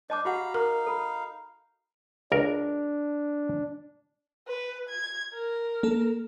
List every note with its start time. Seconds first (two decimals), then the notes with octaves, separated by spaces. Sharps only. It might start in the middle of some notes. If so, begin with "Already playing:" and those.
0.10 D4 C5 D#5 A5 D6
0.25 F#4 G4 F5 F#5 A#5 B5
0.54 D#4 A#4 F5
0.87 A4 B5
2.32 C#2 D4 A#4
4.47 B4
4.89 G#6
5.34 A#4
5.83 A#3 A4